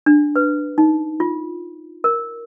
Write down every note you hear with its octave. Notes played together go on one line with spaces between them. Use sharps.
D4
B4
D#4
F4
A#4